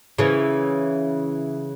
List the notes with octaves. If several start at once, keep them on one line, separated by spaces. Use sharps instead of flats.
C#3 E3